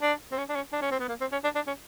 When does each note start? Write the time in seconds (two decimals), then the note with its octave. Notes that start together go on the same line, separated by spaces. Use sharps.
0.02 D4
0.32 C4
0.38 C#4
0.49 D4
0.55 C#4
0.73 D4
0.82 C#4
0.91 C4
1.00 B3
1.08 A#3
1.21 C4
1.32 C#4
1.44 D4
1.55 D4
1.67 C#4